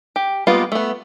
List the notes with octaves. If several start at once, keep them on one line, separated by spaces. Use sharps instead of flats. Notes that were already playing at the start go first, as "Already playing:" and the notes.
G4
G3 G#3 A#3 B3 F4
A3 B3